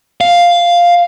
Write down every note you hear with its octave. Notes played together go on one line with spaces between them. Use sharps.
F5